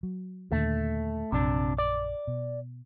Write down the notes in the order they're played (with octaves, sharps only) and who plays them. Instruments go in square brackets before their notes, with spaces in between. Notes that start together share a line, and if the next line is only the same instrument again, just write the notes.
[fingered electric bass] F#3
[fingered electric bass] D#2 A#2 D3 [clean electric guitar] A3
[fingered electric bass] A#1 F#2 [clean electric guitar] C3 D4
[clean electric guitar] D5
[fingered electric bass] B2